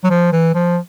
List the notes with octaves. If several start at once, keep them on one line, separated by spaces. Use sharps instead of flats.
F#3
F3
E3
F3